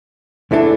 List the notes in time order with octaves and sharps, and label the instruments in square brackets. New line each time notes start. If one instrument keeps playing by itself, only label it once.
[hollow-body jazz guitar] E2 E3 A3 D4 A4